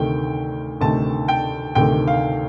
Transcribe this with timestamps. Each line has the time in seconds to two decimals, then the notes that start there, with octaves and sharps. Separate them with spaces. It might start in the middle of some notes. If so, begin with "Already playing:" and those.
Already playing: D2 C3 D#3 A3 G5
0.81 D2 C3 D#3 A3 A5
1.28 G5
1.75 D2 C3 D#3 A3 G5
2.07 F5